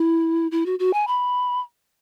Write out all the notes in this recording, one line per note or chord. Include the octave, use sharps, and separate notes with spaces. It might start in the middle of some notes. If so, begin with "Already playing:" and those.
Already playing: E4
E4
F#4
F#4
G#5
B5